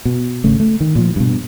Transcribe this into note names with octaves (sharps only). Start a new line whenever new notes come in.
B2
G#1 C#3 A3
A3
D#3
A#2 F3
G2 B2